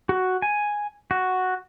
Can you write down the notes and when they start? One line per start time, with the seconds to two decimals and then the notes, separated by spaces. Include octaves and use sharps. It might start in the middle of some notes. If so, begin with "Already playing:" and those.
0.09 F#4
0.42 G#5
1.11 F#4